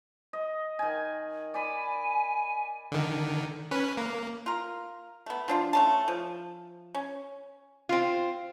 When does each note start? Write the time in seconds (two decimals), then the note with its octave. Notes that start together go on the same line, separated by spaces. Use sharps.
0.33 D#5
0.79 D#3 G#5
1.54 D5 G#5 B5
2.92 D3 D#3
3.71 C#4 B4
3.97 A#3
4.46 F4 A#4
5.26 A3 B3
5.48 F3 D4 F4
5.73 A3 C#4 A5
6.08 F3
6.95 C#4
7.89 C4 F4